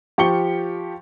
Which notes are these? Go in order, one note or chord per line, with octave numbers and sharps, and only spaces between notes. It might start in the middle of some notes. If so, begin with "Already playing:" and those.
F3 G4 C#6 C#7 G7